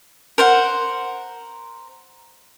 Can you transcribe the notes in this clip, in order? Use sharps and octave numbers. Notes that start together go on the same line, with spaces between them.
A#4 C5 F#5